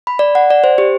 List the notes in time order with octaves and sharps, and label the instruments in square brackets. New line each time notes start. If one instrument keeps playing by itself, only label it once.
[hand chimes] B5
D5
F#5
D5
C5
G4